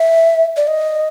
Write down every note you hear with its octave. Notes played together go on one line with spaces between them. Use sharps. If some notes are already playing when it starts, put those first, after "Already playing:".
Already playing: E5
D5
D#5